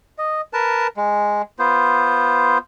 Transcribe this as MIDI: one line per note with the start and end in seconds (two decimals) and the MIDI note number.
0.18 0.41 75
0.53 0.87 70
0.53 0.87 71
0.53 0.87 81
0.97 1.42 56
1.59 2.58 59
1.59 2.58 65
1.59 2.58 72